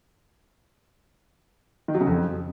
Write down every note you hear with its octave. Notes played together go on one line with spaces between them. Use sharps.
D#3
F#3
C#3
F2